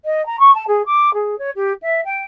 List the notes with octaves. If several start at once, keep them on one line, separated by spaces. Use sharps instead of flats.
D#5
A#5
C#6
A5
G#4
D6
G#4
C#5
G4
E5
G5